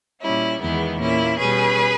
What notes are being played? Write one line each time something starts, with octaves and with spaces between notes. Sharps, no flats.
A#2 G3 C#4 E4
E2 D#3 G#3 B3 E4
A#2 A#3 C#4 E4
B2 G3 C#4 G#4 B4